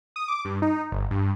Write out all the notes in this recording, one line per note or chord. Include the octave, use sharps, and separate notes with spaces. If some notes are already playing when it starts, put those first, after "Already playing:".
D#6
D6
G2
D#4
G1
G2